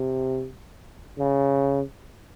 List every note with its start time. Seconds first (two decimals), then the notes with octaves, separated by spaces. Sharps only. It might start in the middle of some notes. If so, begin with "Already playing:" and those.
Already playing: C3
1.18 C#3